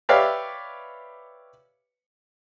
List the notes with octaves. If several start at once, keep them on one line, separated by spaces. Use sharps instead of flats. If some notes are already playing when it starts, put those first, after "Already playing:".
G4 B4 C#5 D5 E5 F5